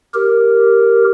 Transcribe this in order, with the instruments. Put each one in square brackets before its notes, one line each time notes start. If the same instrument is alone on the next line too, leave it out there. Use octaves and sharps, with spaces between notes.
[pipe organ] G4 A#4